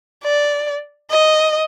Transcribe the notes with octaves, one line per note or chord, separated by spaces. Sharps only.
D5
D#5